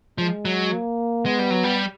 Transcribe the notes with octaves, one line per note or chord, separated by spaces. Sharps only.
F3 G#3
F#3
A#3
G#3 B3
G3
F#3
G3